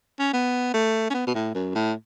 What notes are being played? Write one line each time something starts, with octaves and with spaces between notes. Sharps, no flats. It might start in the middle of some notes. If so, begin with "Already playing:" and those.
C#4
B3
A3
C#4
B3
B2
A2
F#2
A2